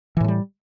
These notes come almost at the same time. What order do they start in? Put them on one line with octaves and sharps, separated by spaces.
E3 A2 G#3 G3